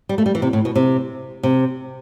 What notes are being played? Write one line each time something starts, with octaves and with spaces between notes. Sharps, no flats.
G3
A3
G3
E3
C3
A2
B2
C3
C3